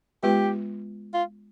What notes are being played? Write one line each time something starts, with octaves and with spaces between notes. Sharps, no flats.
G#3 B3 F4 G4 B4
F4